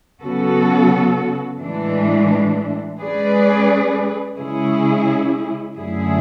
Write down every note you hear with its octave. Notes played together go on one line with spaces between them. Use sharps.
C#3 F#3 B3 F#4 A4
A2 E3 G#3 D4
G#3 C#4 G#4 B4 D5
C#3 G#3 C#4 E4 G#4
F#2 D3 A3 E4 G#4